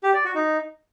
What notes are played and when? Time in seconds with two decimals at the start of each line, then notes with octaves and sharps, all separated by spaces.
0.03 G4
0.14 D5
0.24 F#4
0.35 D#4